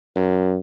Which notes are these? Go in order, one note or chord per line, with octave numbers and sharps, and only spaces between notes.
F#2